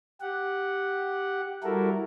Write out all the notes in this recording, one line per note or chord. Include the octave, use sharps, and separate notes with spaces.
G4 F#5
G3 E4 F#4 A4 A#4